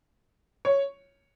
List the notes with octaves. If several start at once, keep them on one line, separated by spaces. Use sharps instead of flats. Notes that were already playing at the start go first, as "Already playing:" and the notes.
C#5